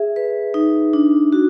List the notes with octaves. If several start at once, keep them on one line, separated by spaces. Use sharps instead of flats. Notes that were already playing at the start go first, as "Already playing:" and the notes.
Already playing: G#4 E5
B4
D#4
D4
F#4